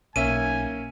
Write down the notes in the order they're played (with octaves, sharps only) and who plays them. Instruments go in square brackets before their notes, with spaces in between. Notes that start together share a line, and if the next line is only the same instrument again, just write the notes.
[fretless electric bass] B1 [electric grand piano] A#3 C#4 E5 [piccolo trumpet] G#5 [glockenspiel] D#7